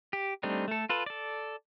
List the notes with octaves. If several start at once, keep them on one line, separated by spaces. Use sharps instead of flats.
G4
G3 A3 C4 D4 D#4
A3 A4
F4 A4 B4
A4 D5